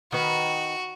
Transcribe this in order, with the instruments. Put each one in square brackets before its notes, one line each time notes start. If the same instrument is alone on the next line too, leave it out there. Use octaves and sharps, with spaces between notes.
[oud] D#3 B4 [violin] F#4